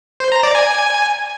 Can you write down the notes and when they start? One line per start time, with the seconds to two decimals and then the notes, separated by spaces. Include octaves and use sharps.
0.20 C5
0.32 A#5
0.43 D5
0.55 G#5